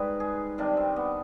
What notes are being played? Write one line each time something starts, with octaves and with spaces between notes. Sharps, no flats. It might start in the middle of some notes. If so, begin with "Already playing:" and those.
Already playing: G#2 G3 B4
G#4
C3 D#3 G3 D4
C4
B3